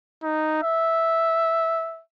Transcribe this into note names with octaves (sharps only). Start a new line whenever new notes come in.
D#4
E5